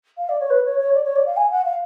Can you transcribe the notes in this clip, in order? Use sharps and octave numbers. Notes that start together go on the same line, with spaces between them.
F5
D5
C#5
B4
C#5
C#5
D5
C#5
D5
F5
G#5
F#5
F5